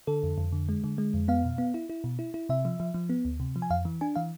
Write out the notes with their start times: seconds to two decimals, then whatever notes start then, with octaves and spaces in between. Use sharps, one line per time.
0.07 D3 A4
0.23 F2
0.38 F2
0.52 D3
0.69 G#3
0.84 D3
0.98 G#3
1.14 F2
1.28 B3 F5
1.44 B2
1.58 B3
1.74 E4
1.90 E4
2.04 B2
2.19 E4
2.34 E4
2.49 C3 E5
2.65 F3
2.80 F3
2.94 F3
3.10 B3
3.25 D2
3.40 C3
3.56 F3
3.62 G#5
3.70 F2 F5
3.85 E3
4.01 D4 G#5
4.16 E3 F5